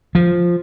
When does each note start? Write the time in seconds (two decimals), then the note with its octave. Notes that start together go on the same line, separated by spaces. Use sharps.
0.15 F3